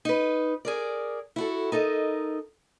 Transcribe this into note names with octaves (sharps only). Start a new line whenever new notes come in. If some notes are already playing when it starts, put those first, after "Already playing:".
D#4 B4
G#4 A#4 D5
E4 F#4 A4
D#4 A4 A#4 D#5